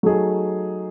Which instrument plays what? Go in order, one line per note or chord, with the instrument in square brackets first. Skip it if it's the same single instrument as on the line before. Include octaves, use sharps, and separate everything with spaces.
[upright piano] F#3 A3 D#4 G#4